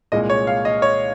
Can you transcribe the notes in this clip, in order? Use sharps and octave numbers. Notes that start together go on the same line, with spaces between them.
C2 A#2 G#3 D#5
C#5
F5
D#5
C#5